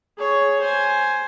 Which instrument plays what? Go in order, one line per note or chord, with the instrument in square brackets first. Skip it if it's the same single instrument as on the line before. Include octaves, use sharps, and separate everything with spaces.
[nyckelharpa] G#4 C#5
C5 G#5